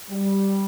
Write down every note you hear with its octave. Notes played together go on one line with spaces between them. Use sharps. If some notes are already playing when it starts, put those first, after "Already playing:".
G3